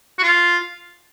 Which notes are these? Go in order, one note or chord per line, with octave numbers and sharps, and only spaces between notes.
F#4
F4